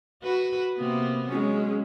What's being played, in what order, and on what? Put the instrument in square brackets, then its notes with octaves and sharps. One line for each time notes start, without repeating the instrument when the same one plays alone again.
[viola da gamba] F#4 B4
C3 A#3 B3
[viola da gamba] F#3 [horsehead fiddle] G#3 C#4